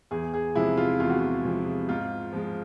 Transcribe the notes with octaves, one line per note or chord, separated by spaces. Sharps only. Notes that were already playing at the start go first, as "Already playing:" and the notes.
E2 G#4
G#4
C3 F3 G#3 E4
F4
E2 F4
F#4
F4
C3 F3 G#3
G#2 F4
F3 G#3